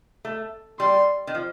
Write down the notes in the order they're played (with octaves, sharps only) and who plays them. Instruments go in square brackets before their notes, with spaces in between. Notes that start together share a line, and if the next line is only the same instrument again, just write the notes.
[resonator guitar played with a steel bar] A3
[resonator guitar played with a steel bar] G3 [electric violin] C6
[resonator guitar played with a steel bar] D#3
F3